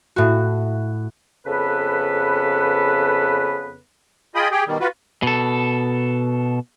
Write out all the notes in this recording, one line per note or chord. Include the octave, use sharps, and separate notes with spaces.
A2 F#4
F2 C#3 B3 A4 B4
F4 G#4 D#5 G5 B5 D#6
G4 G#4 G5
B2 D#3 G3
F4 F#4 B4
B2 A4